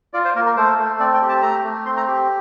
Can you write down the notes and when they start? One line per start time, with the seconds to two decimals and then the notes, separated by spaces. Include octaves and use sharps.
0.13 F4 D5
0.25 C5
0.35 A#3 A#4
0.46 A#4
0.57 A3 C5
0.79 A3
1.00 C4 D5
1.14 G5
1.22 G4
1.29 A5
1.42 A3 A#5
1.64 A3
1.86 C4 C6
1.97 A#5
2.08 G4